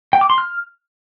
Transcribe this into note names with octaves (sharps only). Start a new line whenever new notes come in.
G5
D6
C6
F6